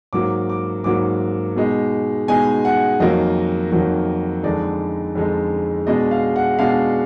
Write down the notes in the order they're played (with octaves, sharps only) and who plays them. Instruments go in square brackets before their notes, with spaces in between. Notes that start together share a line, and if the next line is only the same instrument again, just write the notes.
[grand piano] G#2 F#3 A#3 D6
D6
G#2 F#3 A#3 D6
B2 G#3 D#4
B2 G#3 D#4 G#5
F#5
F2 D#3 F#3 A#3 D#5
F2 D#3 F#3 A#3
F2 D3 G#3 D#4 D5
F2 D3 G#3 D#4
B2 G#3 D4 D#5
F5
F#5
B2 G#3 D4 F5